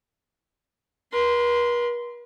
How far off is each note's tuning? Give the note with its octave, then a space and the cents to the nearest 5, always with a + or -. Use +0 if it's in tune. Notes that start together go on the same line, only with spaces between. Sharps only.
B4 -45 C6 -15